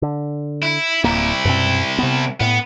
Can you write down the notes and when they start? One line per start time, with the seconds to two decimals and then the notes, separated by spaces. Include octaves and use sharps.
0.02 D3
0.62 E4
1.04 D1 C2 A#3 E4
1.45 F#2 B2 C4
1.98 C3 B3
2.41 A2 B3